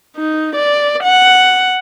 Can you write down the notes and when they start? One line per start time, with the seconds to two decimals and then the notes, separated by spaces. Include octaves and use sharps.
0.17 D#4
0.56 D5
1.04 F#5